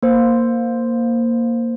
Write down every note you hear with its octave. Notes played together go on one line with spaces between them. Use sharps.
A#3 C5